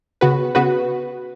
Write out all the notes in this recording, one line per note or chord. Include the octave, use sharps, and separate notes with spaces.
C#3 B3 F#4 B4
C#3 B3 F#4 B4